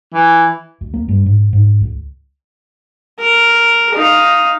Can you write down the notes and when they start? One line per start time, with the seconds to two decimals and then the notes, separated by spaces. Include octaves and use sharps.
0.15 E3
0.81 D2
0.94 A#3
1.08 G2
1.26 G#2
1.53 G#2
1.81 C#2
3.19 A#4
3.94 D#4 F5